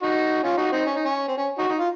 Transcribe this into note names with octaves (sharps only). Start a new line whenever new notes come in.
D#4 F#4
C#4 F4
D#4 F#4
C4 D#4
C#4
D#4
C#4
C4
C#4
D#4 F#4
D#4
F4